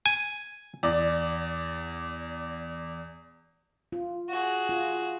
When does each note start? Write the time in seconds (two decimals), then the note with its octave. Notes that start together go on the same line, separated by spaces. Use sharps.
0.06 G#5
0.83 E2 D5
3.92 F4
4.29 F#4 G#4
4.69 F4